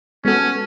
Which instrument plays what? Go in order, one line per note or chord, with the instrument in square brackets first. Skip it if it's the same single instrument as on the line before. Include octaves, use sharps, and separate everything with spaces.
[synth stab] G#3 B3 F#4 A4 [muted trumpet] C#4